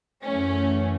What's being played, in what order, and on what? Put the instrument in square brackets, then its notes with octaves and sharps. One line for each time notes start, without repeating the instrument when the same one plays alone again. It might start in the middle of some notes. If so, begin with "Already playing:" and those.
[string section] F#2 E3 A3 C#4